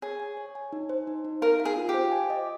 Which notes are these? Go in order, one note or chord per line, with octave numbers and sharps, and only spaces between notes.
G#4 C#5
G#5
C#5
G#5
D#4
C5
D#4
D#4
A#4 F5
F5
G#4
F4
G4
C5
G#5
D#5